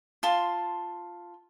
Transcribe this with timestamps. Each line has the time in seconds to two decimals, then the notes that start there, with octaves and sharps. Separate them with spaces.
0.23 F4 A5 C6